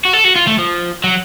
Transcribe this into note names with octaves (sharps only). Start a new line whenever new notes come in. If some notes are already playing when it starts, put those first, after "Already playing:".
F#4
A4
F#4
F4
A3
F3
F#3